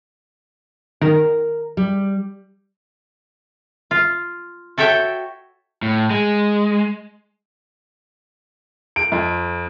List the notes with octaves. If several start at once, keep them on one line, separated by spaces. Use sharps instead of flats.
D#3 A#4
G3
F4
F#4 A4 C#5 E5 G5
A2
G#3
D7
F2